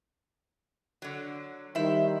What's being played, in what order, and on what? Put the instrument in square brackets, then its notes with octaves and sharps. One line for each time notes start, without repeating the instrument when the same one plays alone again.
[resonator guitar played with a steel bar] D3 F#3
[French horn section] D#3 G3 [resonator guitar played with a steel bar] E4 C5 E5